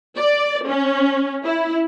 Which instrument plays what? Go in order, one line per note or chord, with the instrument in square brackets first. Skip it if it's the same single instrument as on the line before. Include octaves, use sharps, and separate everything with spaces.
[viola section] D5
C#4
E4